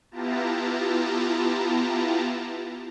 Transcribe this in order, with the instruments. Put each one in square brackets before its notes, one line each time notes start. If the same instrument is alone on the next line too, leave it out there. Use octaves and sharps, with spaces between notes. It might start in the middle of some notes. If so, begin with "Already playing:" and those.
[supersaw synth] B3 E4 F4 G4 A5 A#5